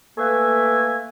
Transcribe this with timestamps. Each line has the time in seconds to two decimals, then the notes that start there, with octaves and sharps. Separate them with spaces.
0.17 A3 A#3 B4 E5 G#5